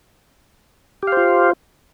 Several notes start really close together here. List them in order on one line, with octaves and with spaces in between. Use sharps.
G4 F5 C5 F4